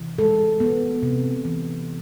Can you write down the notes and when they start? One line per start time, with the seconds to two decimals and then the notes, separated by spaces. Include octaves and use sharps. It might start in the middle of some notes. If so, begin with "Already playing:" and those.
Already playing: C3 E3
0.18 G#3 A4
0.60 B3
1.03 C3
1.45 E3